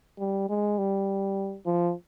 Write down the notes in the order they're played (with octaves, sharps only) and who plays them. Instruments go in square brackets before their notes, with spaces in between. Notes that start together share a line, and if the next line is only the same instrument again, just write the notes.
[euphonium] G3
G#3
G3
F3